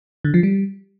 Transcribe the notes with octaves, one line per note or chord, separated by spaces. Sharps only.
D3
F3
G3